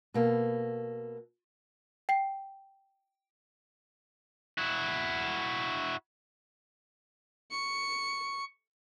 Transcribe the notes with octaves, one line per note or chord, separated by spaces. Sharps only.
B2 A#3 A4
G5 C7
E4 F#4
C#6 C#7